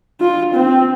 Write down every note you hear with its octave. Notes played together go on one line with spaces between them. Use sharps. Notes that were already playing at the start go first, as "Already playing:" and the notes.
F4
C4